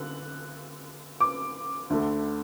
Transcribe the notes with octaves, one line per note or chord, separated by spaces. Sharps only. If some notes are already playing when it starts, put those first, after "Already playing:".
Already playing: D3 F#6
D6
D2 D3 A3